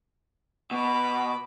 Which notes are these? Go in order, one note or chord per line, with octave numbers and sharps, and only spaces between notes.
B2 B5 D6